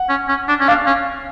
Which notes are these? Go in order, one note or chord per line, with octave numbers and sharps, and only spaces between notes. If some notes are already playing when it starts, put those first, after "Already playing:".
Already playing: F#5
C#4
C#4
D4
C#4
D4 F5
C#4